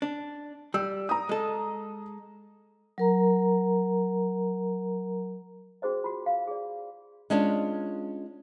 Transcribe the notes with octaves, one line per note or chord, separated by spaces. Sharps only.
D4
G3 E6
A#5 D#6
G#3 A4
F#3 A#4 A#5
C#4 F#4 G#4 C5 D#5
F4 F#4
F5
G#4 D5
G#3 C#4 D4 F4